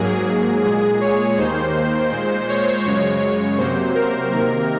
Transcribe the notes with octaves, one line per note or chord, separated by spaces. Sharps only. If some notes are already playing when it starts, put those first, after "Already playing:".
Already playing: G#2 F#3 A#3 G#4
A#2 G#3 G#4
C#5
D#2 D#3 A#3 C5
A#2 G#3
C#5
F#2 C#3 G#3 C#5
C3 F#3 A#3 C5
A#4
C3 D#3 A#3 A#4